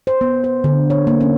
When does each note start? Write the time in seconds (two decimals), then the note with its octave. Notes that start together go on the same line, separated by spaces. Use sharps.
0.07 C5
0.21 B3
0.44 C5
0.64 D3
0.90 C#5
1.07 A#3
1.21 C#4